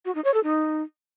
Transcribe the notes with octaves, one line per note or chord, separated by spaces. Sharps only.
F#4
D#4
C#5
A4
D#4